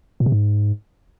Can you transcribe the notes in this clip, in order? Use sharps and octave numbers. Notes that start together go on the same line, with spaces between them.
A#2
C3
G#2